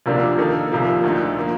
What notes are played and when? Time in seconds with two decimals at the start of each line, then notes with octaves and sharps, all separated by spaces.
0.06 D2 C3 F3 A#3 D4
0.38 D#3 A#3 D#4 A4
0.72 C2 C3 F3 A#3
1.04 D2 D3 A3 D#4
1.37 F3 A#3